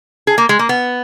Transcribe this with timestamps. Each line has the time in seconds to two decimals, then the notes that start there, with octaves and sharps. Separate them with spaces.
0.27 G#4
0.38 A#3
0.49 G#3
0.59 A#3
0.69 B3